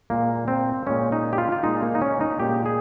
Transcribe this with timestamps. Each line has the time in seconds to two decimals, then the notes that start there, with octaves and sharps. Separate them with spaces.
0.10 A#2 G#3 A#3
0.48 C4
0.86 A#2 G#3 C#4
1.12 D#4
1.33 G4
1.38 F4
1.52 F4
1.63 A#2 G#3 D#4
1.83 A#3
1.95 D#4
2.02 C#4
2.21 D#4
2.39 A#2 G#3 G4
2.66 G#4